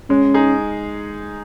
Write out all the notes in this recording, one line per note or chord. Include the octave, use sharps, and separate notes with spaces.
G#3 C#4
D#4 G#4